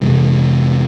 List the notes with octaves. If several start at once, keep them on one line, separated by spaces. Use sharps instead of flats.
F2 C3 E3 G#3